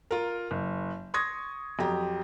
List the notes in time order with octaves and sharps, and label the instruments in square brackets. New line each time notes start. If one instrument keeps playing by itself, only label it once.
[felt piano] F4 A#4
F#1
C6 C#6 D#6 G#6 A#6
F2 F#3 G4 A#5